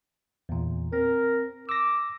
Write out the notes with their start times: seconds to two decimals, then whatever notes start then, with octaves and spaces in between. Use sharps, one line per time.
0.49 E2 A#2
0.93 C4 A#4
1.69 D6 E6 A#6